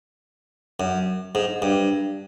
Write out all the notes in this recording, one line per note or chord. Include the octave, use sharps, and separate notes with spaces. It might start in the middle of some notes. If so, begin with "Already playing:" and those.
F#2
G#2
G2